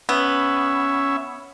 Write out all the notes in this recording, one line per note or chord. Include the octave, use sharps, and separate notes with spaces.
B3 C#4 E5